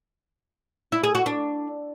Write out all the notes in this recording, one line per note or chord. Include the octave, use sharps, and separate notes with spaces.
E4
G#4
F#4
D4